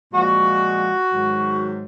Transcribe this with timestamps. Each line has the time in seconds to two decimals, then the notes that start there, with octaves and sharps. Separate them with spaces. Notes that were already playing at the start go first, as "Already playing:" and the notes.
0.13 A#2 F3 G#3 F#4
1.11 G#2 D#3 F#3